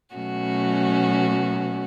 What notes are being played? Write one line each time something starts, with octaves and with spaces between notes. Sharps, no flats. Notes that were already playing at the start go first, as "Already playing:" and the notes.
B2 F#3 A3 C#4 F#4